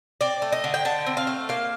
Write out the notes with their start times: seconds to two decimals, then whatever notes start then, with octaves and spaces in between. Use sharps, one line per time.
0.21 C4 D5
0.42 A3
0.52 D#5
0.64 D3
0.74 G5
0.85 D3 A5
1.06 C4
1.17 F5
1.27 A3
1.49 A#3 F5